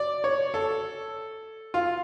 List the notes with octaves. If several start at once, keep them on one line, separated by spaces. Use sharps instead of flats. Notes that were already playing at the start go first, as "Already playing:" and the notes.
Already playing: D5
C#5
A4
F4